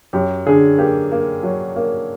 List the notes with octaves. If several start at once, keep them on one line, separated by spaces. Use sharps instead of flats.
F#2 G4
D3 G#4
A#3 G4
A#3
F#3
A#3